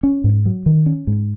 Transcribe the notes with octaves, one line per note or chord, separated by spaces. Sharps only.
C#4
G#2
F#3
D#3
C#4
G#2